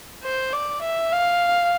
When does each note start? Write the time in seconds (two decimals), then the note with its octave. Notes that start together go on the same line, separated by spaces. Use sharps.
0.22 C5
0.52 D5
0.82 E5
1.12 F5